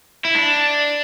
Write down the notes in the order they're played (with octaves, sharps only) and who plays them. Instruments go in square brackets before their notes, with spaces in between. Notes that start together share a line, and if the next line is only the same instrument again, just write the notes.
[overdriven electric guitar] E4
D4